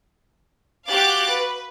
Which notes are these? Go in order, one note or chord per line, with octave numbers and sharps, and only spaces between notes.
F#4 G4 F5 D6 F#6 A6
B4